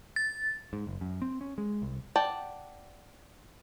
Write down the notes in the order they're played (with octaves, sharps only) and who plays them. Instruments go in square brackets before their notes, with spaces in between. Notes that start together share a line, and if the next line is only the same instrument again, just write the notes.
[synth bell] A6
[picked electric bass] G#2
F#1
F#2
C4
C#4
G#3
C2
[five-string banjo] D5 F#5 G5 A5